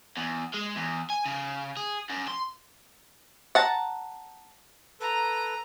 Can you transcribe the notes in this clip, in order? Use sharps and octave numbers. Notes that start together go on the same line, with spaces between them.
E2
G#3
E2
G#5
C#3
G#4
F#2
C6
F#5 A5 A#5
A4 B4 A#5